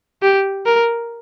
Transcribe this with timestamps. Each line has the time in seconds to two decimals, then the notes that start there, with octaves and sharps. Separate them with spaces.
0.23 G4
0.66 A#4